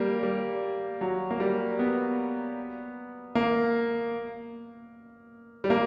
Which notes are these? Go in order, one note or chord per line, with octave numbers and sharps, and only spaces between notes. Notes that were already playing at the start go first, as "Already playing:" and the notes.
Already playing: G3 A#3
G3
F#3
A#3
G3
B3
A#3
G3
A#3